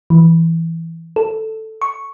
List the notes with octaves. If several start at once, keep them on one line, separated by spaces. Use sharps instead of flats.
E3
A4
C#6